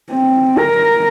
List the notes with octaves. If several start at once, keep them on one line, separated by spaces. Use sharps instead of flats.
C4
A#4